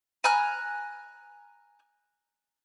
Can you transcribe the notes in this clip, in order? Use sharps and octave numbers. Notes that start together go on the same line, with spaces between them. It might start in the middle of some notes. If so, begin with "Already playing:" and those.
G#5 A#5 F6 F#6